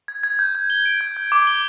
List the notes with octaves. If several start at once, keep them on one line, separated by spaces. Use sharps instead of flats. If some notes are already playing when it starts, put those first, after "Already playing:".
G#6
G#6
G6
G6
G7
D7
G6
G6
D6
G7